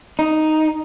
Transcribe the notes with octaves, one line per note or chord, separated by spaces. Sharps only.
D#4